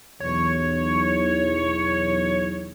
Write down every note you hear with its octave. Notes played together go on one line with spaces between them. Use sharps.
B1 E2 C#5